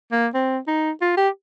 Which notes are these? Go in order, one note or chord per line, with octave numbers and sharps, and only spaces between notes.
A#3
C4
D#4
F4
G4